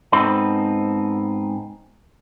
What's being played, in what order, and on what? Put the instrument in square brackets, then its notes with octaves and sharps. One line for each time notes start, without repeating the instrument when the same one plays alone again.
[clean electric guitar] G#2 B3 C4 D#4 A4 B5